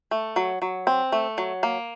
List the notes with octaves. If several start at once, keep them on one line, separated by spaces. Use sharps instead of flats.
A3
F#3
F#3
C4
A3
F#3
A#3